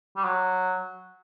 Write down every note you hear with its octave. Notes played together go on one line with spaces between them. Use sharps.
G3
F#3